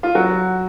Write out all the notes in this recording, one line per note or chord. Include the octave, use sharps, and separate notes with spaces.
F4
F#3 F#4